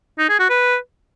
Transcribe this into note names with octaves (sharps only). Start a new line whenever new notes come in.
D#4
G#4
F#4
B4